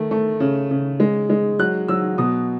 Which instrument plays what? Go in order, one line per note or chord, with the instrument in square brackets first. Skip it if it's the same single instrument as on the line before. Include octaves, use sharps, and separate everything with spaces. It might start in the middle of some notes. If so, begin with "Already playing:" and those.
Already playing: [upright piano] D#3 A3
A3
C#3
C#3
G#3
G#3
F#3 F#6
F#3 E6
B2 D#6